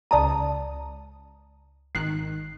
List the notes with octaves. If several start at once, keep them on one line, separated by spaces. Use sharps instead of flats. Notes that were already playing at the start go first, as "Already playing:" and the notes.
C#2 D5 A5 A#5 D#6 D#7
G#1 D#3 F#6 C7